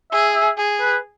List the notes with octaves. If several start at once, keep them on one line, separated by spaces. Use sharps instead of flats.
G#4 E5
E5
G#4
B4